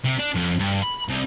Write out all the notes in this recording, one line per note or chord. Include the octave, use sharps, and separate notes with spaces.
C3
D4
F2
G2
B5
C2